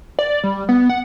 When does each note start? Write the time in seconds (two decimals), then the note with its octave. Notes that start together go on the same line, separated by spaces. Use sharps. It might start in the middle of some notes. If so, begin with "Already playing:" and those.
0.19 D5
0.44 G3
0.69 B3
0.90 F#5